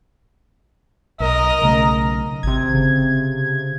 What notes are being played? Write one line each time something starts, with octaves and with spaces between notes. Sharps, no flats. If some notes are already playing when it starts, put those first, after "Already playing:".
B1 A#4 D#5 A#5
B1 C#3 A3
G#1 C3 G#6
C#3